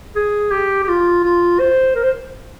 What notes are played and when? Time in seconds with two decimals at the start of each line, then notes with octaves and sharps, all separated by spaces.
0.16 G#4
0.51 G4
0.84 G4
0.88 F4
1.24 F4
1.60 C5
1.96 A#4
2.03 C5